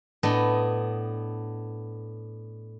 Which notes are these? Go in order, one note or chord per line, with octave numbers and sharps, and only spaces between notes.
A2 B3 D4 D#5